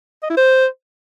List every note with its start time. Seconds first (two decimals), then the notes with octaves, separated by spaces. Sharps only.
0.23 D#5
0.30 E4
0.37 C5